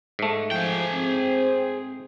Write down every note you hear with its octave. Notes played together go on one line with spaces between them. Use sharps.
G#2 A3
F3 G#4 G5
C4